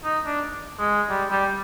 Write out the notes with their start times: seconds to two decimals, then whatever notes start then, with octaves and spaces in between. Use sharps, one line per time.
0.04 D#4
0.26 D4
0.79 G#3
1.10 G3
1.30 G3